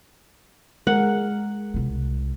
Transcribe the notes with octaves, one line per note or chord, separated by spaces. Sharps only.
G#3 A#4 F#5
C2 C#3